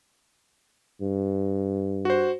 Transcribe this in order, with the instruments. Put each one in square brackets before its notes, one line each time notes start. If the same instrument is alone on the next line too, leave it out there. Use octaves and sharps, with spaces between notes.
[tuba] G2
[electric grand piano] F#4 C5